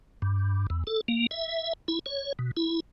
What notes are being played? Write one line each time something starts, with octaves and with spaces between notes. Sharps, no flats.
G2
E2
A4
A#3
E5
E4
C#5
B2
E4